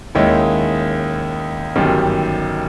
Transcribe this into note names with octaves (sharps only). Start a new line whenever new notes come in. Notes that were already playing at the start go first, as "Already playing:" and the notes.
D#2 D#3 G#3 C#4 E4
G1 F#2 D#3 G3